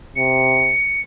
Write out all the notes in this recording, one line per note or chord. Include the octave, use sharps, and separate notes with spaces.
C3 C#7